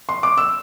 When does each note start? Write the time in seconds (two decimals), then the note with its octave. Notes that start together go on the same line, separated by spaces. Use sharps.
0.09 C6
0.23 D6
0.38 E6